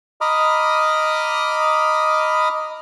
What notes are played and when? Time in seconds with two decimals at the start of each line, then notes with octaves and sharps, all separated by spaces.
0.21 D#5 A#5 B5 D6 D#6 F6